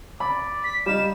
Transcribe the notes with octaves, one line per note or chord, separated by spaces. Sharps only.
D5 B5
B6
G3 D#4 F5 E7